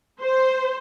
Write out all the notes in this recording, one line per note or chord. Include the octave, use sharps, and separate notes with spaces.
C5